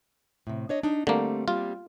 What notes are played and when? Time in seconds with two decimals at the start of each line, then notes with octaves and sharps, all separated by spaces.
0.47 A2 C3
0.69 D4 C#5 D#5
0.83 D4 D#4
1.07 D3 G3 A3 A#3 C4
1.48 G3 A#3 C4 F4